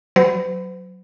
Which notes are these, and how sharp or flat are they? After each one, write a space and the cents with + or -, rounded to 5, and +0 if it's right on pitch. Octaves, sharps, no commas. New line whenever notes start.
F#3 +0 C5 -45 B5 +25